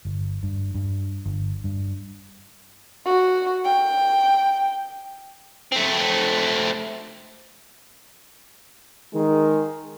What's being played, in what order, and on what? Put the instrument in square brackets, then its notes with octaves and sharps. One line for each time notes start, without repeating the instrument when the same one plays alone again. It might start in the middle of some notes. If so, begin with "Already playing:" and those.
[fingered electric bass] G1
G2
G2
G1
G2
[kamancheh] F#4
G5
[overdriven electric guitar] A3 C4
[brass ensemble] D#3 G#3